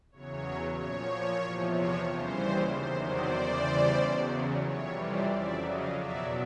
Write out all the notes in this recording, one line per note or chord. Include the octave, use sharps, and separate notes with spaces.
E2 C#3 F#3 C#5
A#2 F3 C#5
E2 C3 F3
C#5
D#2 C#3 E3 G3 C5
E2 C3 D#3 F#3 C5
C5 D5
E2 C#3 E3 G3
E2 C#3 F#3
C#5
F2 C3 E3 G3 C#5
C5 D5
F2 C#3 F#3 D5 E5
D#5 F5
E2 B2 F#3 D5 E5